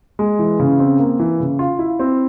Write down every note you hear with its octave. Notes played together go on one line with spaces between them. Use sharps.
G#3
E3
C#3
C4
A#3
E3
C#3
F4
E4
C4